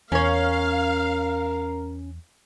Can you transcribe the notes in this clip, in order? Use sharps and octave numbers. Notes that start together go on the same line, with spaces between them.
E2 C#4 A#4 C#5 F5